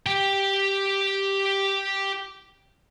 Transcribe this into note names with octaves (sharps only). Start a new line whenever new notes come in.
G4 G5